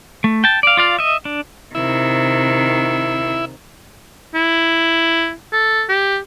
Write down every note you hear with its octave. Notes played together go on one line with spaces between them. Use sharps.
A3
G5 A5
D5 F5
F4 D5 F5
D#5 E5
D4
C3 D#3 E4
E4
A4
G4